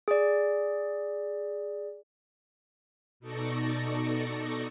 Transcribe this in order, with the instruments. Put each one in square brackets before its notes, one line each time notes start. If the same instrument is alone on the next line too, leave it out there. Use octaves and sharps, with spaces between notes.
[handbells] G#4 D5
[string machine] B2 D#4 A4 D5 C#6 A#6